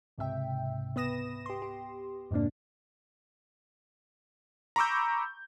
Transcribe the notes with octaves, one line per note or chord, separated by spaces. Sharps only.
C#2 G#2 C3 E5 G5
B3 B4 D#6 A#6 E7
G4 C6
G4
F2 G#2 C3 A#3 D4
A#5 B5 C#6 D6 E6 G6